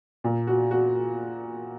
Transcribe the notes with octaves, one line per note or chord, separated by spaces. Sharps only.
A#2
F#4
F#4